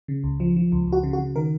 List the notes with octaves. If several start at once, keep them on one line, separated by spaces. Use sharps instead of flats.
C#3
C#2
F3
F3
C#2
C#2 F#4
C#3
F#4
C#3
D#3 A#4